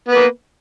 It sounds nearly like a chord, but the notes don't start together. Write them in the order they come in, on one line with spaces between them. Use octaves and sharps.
B3 B4 A#3